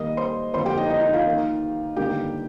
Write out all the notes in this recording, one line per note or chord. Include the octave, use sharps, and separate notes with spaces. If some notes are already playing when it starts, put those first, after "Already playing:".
Already playing: D#2 D#3 G3 A#3 D#5 D#6
C5 C6
G1 F2 F3 A#3 C5 C6
G4 G5
D#4 D#5
D#4 D#5
D#4 D#5
F4 F5
D#2 D#3 A#3
G1 G2 D#3 A#3 G4 G5